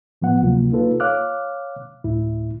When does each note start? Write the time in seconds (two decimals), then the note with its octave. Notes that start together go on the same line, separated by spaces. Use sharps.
0.22 A2 F3 B3 F#5
0.43 D2 C3 F#3 A#3 F4
0.72 A#3 D#4 F4 A4 B4
1.00 C#5 F5 D6 F6 F#6
2.04 D2 A2 E4